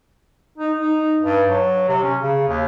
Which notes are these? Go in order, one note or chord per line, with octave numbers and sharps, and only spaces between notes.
D#4
D#4
G2
F#3
C3
C#4
C#3
D#2